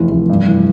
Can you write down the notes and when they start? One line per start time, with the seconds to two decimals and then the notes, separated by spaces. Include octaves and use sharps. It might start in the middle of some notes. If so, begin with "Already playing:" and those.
Already playing: F1 E3
0.11 F1
0.29 G2
0.47 E3